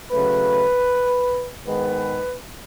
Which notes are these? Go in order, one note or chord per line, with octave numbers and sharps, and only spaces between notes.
C#3 F#3 A3 B4
G#2 D#3 G#3 B3 B4